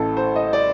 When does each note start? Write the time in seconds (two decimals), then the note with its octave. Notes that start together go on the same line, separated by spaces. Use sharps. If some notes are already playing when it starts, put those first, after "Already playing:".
Already playing: A1 A2 A4
0.17 C5
0.36 D#5
0.53 D5